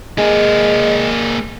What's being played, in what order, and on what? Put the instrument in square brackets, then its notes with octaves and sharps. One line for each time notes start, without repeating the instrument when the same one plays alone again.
[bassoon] G#3 [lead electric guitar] A#3 G#4